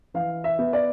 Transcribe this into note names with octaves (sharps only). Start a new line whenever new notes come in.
E3 F5
E5
B3
D5